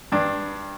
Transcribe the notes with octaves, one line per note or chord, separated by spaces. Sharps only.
G2 D4